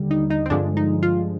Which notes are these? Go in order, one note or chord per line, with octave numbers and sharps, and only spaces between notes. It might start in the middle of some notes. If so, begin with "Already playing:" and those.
Already playing: D#2 D3 G3
D#4
D#4
C4
G2 D3 F3 G#3 D4
D#4
F4